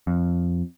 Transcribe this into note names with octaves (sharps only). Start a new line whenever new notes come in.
F2